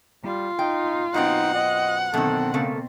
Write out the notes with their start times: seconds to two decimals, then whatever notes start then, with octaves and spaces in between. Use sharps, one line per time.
0.24 G3 F4
0.59 D#4 G5
1.14 F#2 B2 C4 D#4 F#5
1.55 D#5
2.14 F#2 B2 D3 D#3 C4 A4
2.54 C#3 A3 A#3 A4